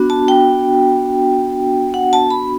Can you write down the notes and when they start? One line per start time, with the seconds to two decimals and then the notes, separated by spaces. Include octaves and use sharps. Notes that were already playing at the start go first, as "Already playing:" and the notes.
Already playing: B3 D4 F#4
0.10 A5
0.28 G5
1.94 F#5
2.13 A5
2.30 B5